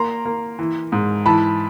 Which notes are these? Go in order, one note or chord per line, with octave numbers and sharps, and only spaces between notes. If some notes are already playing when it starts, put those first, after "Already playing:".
Already playing: A#3 A#5 C6
A#3
E3
G#2
E3 A5 B5